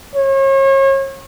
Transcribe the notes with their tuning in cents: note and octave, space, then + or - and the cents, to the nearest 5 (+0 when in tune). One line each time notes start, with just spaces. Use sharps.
C#5 -35